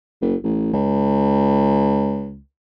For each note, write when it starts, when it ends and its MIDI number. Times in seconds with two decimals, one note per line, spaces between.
0.22 0.35 30
0.44 0.72 33
0.73 2.41 37